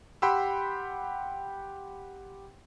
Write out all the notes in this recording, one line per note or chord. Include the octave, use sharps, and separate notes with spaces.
G4 F#5 G5 B5 C6 E6